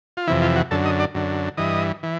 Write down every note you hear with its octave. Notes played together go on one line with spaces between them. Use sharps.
F4
F2 C3 E3 E4
F4
F#4
F#2 D3 A4
D#5
D5
F#2 D3
G2 E3 D#5
E3